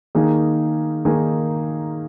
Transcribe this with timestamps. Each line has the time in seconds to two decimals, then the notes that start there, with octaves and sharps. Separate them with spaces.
0.15 D#3 A#3 D#4 G#4
1.05 D#3 A#3 D#4 G#4